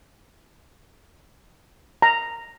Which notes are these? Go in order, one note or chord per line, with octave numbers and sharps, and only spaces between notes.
A#5